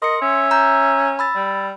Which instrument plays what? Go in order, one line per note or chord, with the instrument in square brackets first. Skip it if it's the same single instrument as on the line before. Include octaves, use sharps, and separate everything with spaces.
[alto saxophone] A#4 [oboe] D#5 [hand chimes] C6 C#7
[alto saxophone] C#4 [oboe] E5
[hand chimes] A#5 G6
B5 E6 A6
[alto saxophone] G3